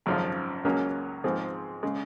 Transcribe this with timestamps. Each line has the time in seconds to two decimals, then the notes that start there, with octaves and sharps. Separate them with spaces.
0.06 G#1 F#2 C#3 F3
0.65 C#2 C#3 F#3 A#3 C#4
1.24 G#2 F3 G#3 C4
1.83 C#3 G#3